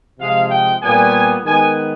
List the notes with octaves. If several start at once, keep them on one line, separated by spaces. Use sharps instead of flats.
C3 F3 G#3 F5
G5
A#2 G3 B3 G#5
D#3 G#3 B3 G#5